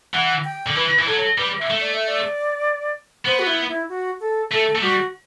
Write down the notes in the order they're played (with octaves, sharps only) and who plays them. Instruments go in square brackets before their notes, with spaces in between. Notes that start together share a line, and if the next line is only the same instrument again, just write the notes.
[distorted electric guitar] E3 [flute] F#5
[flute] G5
[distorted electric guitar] D3
[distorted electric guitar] E3 [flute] B4
[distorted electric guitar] E3
[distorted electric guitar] F#3 [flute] A4
[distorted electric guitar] G3 [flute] B4
[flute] E5
[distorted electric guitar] A3
[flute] D5
E5
D5
[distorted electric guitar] B3 [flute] C5
[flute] F#4
E4
E4
F#4
A4
[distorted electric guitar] A3 [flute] A4
[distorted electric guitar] A3
[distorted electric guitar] G3 [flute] F#4